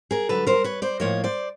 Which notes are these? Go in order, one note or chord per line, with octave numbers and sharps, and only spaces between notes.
G#4 A#4
G2 D3 F#3 A4 B4
A#4 C5
B4 C#5
C5 D5
A2 F3 A#3 C#5 D#5
C5 D5